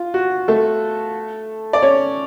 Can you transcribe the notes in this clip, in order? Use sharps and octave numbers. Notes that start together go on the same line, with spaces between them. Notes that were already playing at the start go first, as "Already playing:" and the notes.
Already playing: F4
F#4
A3 A4
D5
C#4 C#5